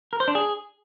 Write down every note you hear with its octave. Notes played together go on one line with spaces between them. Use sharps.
A#4
C5
D4
G#4